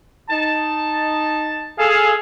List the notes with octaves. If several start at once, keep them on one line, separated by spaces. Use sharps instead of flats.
D#4 A5
G#4 A4 F5